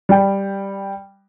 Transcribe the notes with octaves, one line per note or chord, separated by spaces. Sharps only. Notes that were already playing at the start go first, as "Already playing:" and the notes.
G3 G5